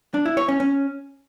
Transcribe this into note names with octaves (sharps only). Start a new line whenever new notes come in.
D4
E4
C#5
C#4
C#4